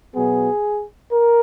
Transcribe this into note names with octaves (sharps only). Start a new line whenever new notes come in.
B2 F#3 B3 G#4
A#4